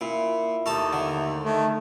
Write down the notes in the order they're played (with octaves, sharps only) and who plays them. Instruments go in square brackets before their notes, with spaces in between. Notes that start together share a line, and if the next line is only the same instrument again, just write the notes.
[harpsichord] A#2 [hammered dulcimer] E4
[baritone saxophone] D#2 [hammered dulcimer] A3 [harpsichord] D#4 A5 D#6
[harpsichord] D3
[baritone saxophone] D#3 [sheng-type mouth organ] A3